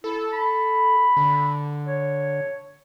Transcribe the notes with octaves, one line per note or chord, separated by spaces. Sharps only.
E4 A4
B5
D3
C#5